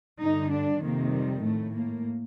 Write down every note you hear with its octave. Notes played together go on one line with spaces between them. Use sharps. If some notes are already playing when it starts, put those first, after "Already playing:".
G2 D3 D#4
D4
F2 C3 D#3 A#3
G3
A2 A3
A#3